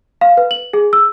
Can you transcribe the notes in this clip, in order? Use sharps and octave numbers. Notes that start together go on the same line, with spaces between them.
F5
B4
F#7
G#4
E6